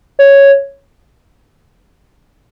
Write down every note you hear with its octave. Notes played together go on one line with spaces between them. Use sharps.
C#5